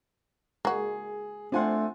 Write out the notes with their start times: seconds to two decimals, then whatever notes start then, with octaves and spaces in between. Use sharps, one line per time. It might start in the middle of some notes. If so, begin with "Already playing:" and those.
0.65 G#3 A#3 F#4 G#4
1.52 A3 C4 D4 F4 F#5 G#5 C6